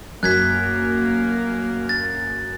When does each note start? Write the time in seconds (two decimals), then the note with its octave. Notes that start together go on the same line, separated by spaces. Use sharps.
0.23 F#2 A#3 F#6 G#6 B6
1.89 A6